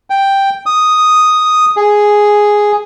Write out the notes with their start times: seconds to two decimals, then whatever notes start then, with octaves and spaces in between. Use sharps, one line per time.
0.10 G5
0.66 D#6
1.76 G#4